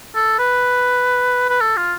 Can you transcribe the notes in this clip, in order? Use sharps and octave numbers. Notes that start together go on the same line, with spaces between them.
A4
B4
B4
A4
F4